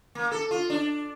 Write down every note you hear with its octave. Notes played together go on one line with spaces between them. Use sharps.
A#3
A4
F4
D4